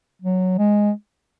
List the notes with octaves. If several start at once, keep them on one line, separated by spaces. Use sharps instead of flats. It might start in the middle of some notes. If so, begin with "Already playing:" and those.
F#3
G#3